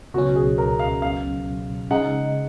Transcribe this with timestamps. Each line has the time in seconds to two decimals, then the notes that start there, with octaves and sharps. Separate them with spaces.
0.14 C#2 B2 F#3 C#4 F#4
0.36 G#4
0.58 A#4
0.79 F5
1.02 F5
1.91 C#3 G#3 D#4 F#5